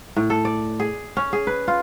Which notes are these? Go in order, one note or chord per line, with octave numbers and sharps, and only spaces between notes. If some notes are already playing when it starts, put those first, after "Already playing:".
A2
A4
D5
G#4
C#4
G#4
B4
F4